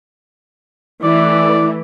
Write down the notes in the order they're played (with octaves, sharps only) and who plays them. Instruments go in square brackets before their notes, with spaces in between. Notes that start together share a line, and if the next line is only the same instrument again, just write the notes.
[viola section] E3 A3 [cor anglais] D5